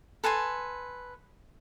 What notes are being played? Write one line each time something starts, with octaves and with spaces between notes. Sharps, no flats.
A4 B4 G#5 C6